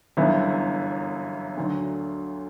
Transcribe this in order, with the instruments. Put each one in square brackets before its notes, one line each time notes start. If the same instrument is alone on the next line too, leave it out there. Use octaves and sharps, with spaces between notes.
[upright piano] G1 F#2 E3 B3 E4
D2 D3 F#3